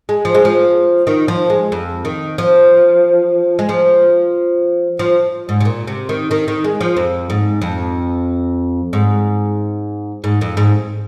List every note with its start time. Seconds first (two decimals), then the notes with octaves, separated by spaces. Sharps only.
0.09 G#3
0.25 F3
0.35 G#3
0.45 F3
1.07 D#3
1.28 F3
1.50 G#3
1.72 F2
2.05 D#3
2.38 F3
3.59 G#3
3.69 F3
4.99 F3
5.49 G#2
5.60 C3
5.65 A#2
5.87 C3
6.09 D#3
6.31 D#3
6.48 D#3
6.64 G#3
6.81 F3
6.97 F2
7.30 G#2
7.62 F2
8.93 G#2
10.24 G#2
10.41 F2
10.57 G#2